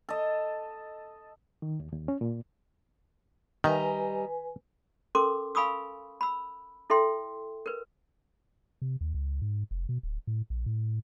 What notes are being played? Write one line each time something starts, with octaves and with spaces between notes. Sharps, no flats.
A4 D#5
D#3
D#2
D#2
C#4
A#2
D#3 G3 B4 D#5 G#5 A#5
C#4 A4 A#4 C6 D6
F5 G#5 B5 C#6 D#6 E6
B5 E6
E4 A4 E5 G5 C6
A#4 B4
C3
D#2
C#2
G#2
F1
B2
D1
A2
A#1
A2